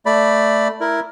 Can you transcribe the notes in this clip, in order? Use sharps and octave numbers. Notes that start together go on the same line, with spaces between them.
A3 D5 B5
E4 A#4